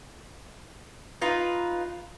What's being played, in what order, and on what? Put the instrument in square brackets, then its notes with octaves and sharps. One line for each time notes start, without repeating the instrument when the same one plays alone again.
[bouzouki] D#4 F4 B4